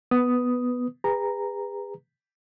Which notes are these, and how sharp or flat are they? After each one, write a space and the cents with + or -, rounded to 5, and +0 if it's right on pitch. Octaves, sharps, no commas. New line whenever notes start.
B3 +0 B4 +0 D#6 +0
G#4 -40 B4 +0 A#5 -5